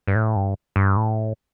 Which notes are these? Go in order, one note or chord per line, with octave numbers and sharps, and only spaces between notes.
G2
A2
G2
G2
A2